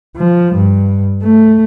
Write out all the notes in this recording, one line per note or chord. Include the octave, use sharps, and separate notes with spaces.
F3
G2
A3